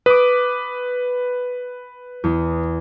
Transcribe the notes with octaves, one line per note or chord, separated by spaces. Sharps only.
B4 D6 D#6
E2